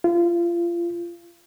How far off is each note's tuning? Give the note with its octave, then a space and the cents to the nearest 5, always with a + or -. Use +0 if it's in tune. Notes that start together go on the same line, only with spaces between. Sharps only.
F4 -30